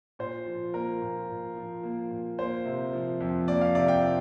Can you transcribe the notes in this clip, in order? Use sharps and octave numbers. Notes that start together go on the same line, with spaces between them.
A#2 C5
F3
A#3 A#4
A#2
A#2
F3
A#3
A#2
A#3 C5
C3
F3
F2
A#3 D5
F5
C3 D5
G5
F3